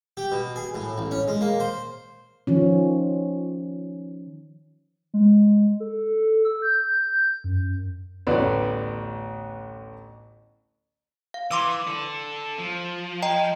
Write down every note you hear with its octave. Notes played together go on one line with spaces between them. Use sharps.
G4
B2
G#4
A2
A1
C#4
G#3
A#3
C5
D#3 F3 C#4
G#3
A4
E6
G6
F#2
A1 D2 B3 D5
F5
E3 C6 D6 E6
A4 D5
F3
D#5 G5 A#5